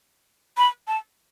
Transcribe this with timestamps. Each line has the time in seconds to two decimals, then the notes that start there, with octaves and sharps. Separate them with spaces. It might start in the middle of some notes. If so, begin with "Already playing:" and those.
0.57 B5
0.88 A5